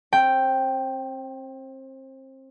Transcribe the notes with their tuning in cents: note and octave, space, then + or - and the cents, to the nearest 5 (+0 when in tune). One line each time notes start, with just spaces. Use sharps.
C4 +30 G5 +0